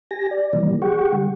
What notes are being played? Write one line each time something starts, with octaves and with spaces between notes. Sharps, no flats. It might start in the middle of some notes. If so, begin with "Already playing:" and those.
G4 G#5 A#6
D5
C3 D#3 E3 F#3 G3 A#3
G4 G#4 F#5 G5 C#6
D3 G3